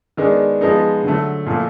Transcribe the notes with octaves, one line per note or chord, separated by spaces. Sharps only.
D#3 G#3 B3 D4
F3 G#3 B3 D#4
D3 F#3 A3
A#2 F3 A3